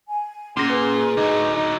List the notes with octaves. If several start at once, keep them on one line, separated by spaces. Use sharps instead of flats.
G#5
A#2 C#4 G#4 C6 A#6
B4
D3 F#3 D#4
D#4